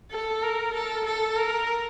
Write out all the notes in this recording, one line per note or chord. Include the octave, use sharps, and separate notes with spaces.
A4
A#4
A4
A4
A#4